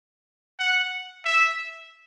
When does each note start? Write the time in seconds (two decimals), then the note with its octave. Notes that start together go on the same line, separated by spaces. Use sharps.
0.59 F#5
1.25 E5